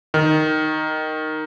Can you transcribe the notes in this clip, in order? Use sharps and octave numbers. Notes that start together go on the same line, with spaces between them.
D#3